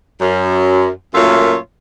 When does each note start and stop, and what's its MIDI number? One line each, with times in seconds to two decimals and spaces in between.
0.19 0.88 42
1.14 1.55 42
1.14 1.55 46
1.14 1.55 57
1.14 1.55 65
1.14 1.55 73
1.14 1.55 76